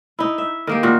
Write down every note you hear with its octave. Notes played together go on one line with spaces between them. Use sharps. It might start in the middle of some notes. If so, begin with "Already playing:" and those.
D#4 E4
E5
D#3 A#3 G4
A#2 F#4